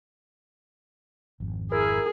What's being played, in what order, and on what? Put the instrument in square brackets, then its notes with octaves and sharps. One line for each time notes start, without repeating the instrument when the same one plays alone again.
[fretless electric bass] G#1 F2
[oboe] E4 [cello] G#4 [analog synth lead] A#4